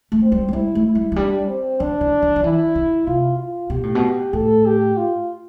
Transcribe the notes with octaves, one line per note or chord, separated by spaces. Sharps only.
A3
C4
G3
A3
G3 E4
A3
E4
G3
F3
G3 D4
C4
F3 D4
E3
E3
F3
E3 E4
D3
C3 F4
F4
B2 G4
A2
B2
A2 A4
G4
F4